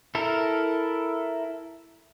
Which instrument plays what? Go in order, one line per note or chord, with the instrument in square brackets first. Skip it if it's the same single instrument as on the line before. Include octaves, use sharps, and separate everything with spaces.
[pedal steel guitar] E4 A4 A#4